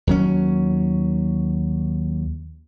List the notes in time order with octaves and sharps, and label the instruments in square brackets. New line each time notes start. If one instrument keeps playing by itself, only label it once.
[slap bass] D#2 F#3 C#4